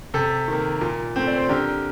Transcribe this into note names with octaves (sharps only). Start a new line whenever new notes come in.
C3 A4
D#3 A#3
A#2
A3 C4
D5
C5
D3 G4 A#4